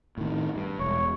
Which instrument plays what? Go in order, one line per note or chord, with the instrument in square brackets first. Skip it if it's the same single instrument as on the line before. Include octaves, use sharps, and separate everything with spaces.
[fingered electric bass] A2 D#3
G2
[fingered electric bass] E1 [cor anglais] C#5